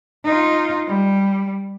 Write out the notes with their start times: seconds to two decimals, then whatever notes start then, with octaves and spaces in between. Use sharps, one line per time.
0.25 D#4 F4
0.87 G3